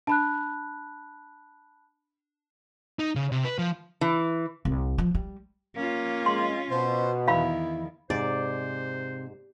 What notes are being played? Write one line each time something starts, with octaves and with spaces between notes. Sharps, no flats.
D4 A5 B5 F#6
D#4
C#3
C3
B4
F3
E3
C2
F3
G3
A#3 C#4 F4
G#3 C6
B2 C5
E2 D#3 E4 F5 B5
G#2 C3 C5 D5